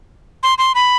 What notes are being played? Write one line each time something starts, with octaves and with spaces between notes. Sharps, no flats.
C6
C6
B5